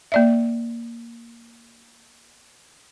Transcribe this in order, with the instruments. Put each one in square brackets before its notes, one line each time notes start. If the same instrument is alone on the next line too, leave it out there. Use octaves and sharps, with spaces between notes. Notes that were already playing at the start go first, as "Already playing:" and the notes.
[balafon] A#3 D5 E5